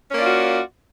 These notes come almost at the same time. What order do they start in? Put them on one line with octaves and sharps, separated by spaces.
C#4 A#3 D5 F4 F#4